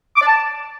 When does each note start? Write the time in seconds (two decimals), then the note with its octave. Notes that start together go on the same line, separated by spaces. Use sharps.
0.16 D6
0.21 D5
0.26 A5